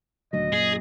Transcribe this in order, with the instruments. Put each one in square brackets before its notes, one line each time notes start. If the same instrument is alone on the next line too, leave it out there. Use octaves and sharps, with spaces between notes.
[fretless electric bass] D#1 D2 F#3 [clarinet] D#5
[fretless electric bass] F#2 A#2 [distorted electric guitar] G#4